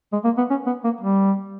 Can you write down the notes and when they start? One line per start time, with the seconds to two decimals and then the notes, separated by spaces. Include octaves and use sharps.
0.13 G#3
0.24 A#3
0.38 B3
0.50 C#4
0.66 B3
0.84 A#3
1.01 G3